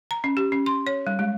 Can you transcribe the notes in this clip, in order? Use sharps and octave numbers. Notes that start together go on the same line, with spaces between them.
A#5
C#4
G4
C#4
C6
C#5
G3
G#3